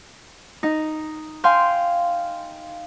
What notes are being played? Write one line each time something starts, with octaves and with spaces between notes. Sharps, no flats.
D#4
F5 G5 G#5 C6